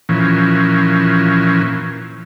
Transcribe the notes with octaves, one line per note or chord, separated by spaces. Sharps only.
A#2 E3 F3 C#4